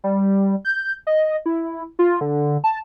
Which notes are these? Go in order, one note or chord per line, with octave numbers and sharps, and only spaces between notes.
G3
G6
D#5
E4
F4
D3
A5